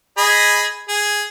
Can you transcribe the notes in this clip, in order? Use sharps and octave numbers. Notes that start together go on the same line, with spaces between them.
G#4 D#5 B5
G#4